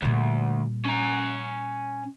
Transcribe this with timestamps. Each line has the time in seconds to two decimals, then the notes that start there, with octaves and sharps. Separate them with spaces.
0.02 D2 A#2 G3
0.85 C#4 A#5